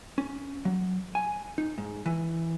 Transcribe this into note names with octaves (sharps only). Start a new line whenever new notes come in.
C#4
F#3
G#5
D#4
G#2
E3